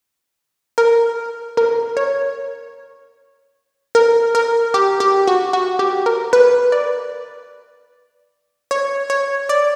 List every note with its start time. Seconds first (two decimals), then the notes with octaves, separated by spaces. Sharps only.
0.78 A#4
1.57 A#4
1.97 C#5
3.95 A#4
4.35 A#4
4.74 G4
5.00 G4
5.28 F#4
5.53 F#4
5.79 G4
6.06 A#4
6.33 B4
6.72 D5
8.71 C#5
9.10 C#5
9.49 D5